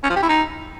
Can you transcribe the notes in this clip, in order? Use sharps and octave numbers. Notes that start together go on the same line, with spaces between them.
C#4
F3
G4
E4
D#4